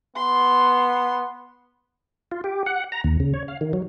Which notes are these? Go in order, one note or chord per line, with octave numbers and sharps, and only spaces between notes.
B3 C6
F4
G4
F#5
A#5
D#2
C#3
C#5
F5
D#3
F#3